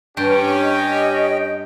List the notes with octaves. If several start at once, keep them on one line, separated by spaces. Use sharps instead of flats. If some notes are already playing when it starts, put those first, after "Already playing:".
G2 C#4 G4 G5
D#5